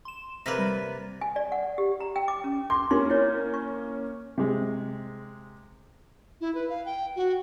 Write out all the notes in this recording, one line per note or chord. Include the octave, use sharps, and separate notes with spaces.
C6 E7
C3 A#3 B4 A#6 B6 D#7
G3 A6
G#5
D5
F#5
G4
A#5
G5
D6
C#4
C6 D6
A#3 C#4 C6
E4 C#5
C#6
C3 G#3
E4
B4
F5
G5
F#4